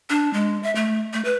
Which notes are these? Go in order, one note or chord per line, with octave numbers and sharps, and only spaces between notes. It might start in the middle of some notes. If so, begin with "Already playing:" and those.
D4
G#3
E5
A3
A3
B4